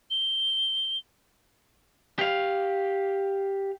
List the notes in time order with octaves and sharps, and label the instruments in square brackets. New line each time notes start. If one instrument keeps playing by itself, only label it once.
[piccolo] G7
[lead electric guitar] G4 F5